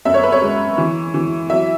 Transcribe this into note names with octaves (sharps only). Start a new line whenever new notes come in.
F#2 E5
C#5
B4
C#5
G#3
E3
E3
F#3 E5